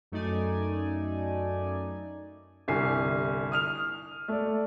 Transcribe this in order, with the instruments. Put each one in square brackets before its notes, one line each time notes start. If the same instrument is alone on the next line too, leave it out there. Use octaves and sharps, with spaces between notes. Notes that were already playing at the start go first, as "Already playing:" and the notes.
[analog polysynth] F#2 A3 D#4 D5 G#5
[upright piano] G1 C2 G#5 C7
D#6 F6 F7
A3 D5